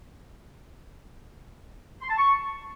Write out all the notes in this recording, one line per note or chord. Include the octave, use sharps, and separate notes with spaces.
C6
A5
C#6